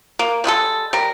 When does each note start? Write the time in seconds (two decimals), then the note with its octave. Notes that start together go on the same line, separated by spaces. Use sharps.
0.19 A#3
0.44 G3 G#3 E4 A4
0.93 G3 A#4